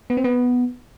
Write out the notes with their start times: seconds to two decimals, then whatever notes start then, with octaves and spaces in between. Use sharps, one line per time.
0.10 B3
0.17 C4
0.24 B3